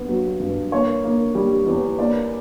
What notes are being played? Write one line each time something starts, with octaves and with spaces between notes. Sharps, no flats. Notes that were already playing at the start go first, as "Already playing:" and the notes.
Already playing: G2 B3
F#3
G2
A#3 C#5
A#3
G3
E2
A#3 D5